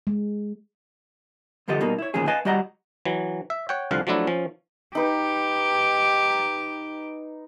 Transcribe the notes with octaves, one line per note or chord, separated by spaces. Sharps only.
G#3
G2 D3 F3 G4 A4 D#5
B2 G3 A#3 D#4
E4 C#5
D2 A#2 D#3 F3 C#4 G#4
B4 D#5 F5 G#5 A5
G3 F#4 G4 D#5 F#5 A#5
E3 F#3
E5
C#5 F#5 G5
C2 D3 F3 F5 F#5
F3 F#3 A3 D4 E4
F3 C#4
D#4 G4 B4